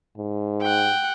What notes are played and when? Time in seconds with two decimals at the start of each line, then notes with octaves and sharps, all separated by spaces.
0.18 G#2
0.62 F#5 G5